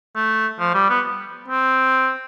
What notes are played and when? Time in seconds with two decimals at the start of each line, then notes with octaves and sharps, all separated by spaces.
0.16 A3
0.60 F3
0.74 G3
0.89 B3
1.48 C4